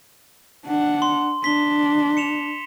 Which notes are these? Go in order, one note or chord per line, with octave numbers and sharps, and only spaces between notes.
D4 F#5
C6
D4 B6 G7
C#7 E7 F7